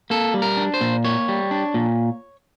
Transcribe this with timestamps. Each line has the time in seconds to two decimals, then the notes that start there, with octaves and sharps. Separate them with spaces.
0.10 A#3 A4
0.34 G3
0.42 A#4
0.57 D4
0.74 C5
0.81 A#2
1.05 A#3 C#5
1.28 G3
1.51 D4
1.74 A#2